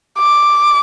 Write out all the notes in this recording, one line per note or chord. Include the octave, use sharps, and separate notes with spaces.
D6